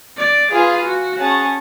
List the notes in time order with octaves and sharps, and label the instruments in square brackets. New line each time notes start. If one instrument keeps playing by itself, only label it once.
[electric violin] D5
[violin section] F4 B4 F5 G#5 [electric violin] G#4
[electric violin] F#4
[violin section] C#4 G#4 C#5 F#5 A5